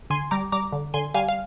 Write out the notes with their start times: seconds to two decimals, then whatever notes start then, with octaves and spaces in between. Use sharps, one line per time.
0.10 D3 G#5 C6
0.31 G3 A#5 D6
0.52 G3 A#5 D6
0.72 D3
0.94 D3 G#5 C6
1.14 G3 F5 G#5
1.29 F5